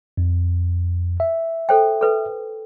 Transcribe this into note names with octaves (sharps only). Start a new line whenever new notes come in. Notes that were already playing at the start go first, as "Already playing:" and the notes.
F2
E5
A4 C5 G5
A4 B4